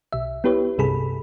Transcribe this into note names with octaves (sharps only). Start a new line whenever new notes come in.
B1 E5
B3 E4 G4 B4 C#5
C2 G2 C3 G#4 A4 B5